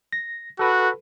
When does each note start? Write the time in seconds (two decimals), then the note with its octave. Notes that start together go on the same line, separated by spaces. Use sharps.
0.13 A#6
0.59 F#4 A4 B4